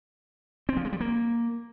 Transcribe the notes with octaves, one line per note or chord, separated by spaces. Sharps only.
C4
F3
G#3
G3
A#3